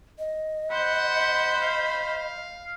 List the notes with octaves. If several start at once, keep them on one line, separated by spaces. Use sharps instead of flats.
D#5
C5 F#5 B5 G6
F5